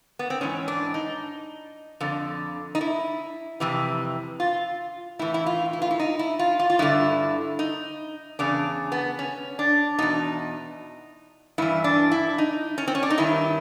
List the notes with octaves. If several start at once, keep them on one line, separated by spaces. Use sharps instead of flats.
B3
C4
G#2 E3 C#4
D4
D#4
F2 D3
D#4
E4
F2 C3 E3
F4
A2 E3 E4
E4
F4
E4
F4
E4
D#4
E4
F4
F4
F4
G2 D3 E4
D#4
E2 C#3 D4
B3
C#4
D4
E2 B2 D#4
G2 E3 E4
D4
E4
D#4
C#4
C4
C#4
D4
D#4
G2 D#3 E4